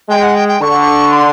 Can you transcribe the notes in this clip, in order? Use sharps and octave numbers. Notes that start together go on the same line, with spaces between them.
G#3 G5
F#5
G5
G5
D3 C#6
C6